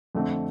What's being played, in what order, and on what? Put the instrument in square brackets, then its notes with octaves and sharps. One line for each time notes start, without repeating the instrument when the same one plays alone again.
[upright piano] F2 D3 A3 C4